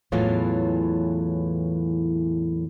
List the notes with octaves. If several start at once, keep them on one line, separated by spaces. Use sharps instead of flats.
E2 A2 E3 F#3 F4 C#5